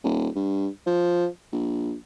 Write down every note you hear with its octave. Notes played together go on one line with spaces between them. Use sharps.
D#1
G2
F3
A#1